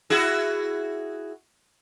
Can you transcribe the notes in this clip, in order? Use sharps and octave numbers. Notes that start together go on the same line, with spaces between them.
E4 F#4 G#4